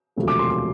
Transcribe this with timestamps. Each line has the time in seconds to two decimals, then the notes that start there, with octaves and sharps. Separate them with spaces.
0.16 E1 D2 C3 F3 A3
0.28 D6
0.39 C6
0.50 D6